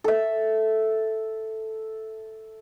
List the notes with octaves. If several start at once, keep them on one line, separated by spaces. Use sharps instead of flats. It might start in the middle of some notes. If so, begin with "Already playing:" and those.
A4 E5